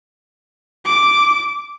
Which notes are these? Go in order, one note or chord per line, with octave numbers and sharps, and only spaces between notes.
D6